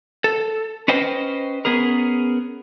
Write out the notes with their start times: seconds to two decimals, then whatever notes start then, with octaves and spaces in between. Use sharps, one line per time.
0.24 A4
0.88 C#4 B4 C5 D#5 G5
1.65 B3 C#4 G#4 A#4